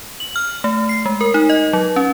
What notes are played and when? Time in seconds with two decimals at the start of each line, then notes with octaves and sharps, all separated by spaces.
0.20 F#7
0.36 F6
0.64 A3
0.89 C7
1.06 G#3
1.21 A#4
1.34 D#4
1.49 D#5
1.73 F#3
1.96 C#4